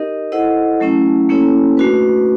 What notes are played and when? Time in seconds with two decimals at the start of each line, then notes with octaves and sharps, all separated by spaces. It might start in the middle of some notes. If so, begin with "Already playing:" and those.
Already playing: D#4 G4 A#4 D#5
0.32 E4 A4 C5 D#5 F#5
0.80 F#3 A3 C#4 E4
1.29 A#3 C#4 E4 A4 C#5
1.77 A3 D4 F#4 B4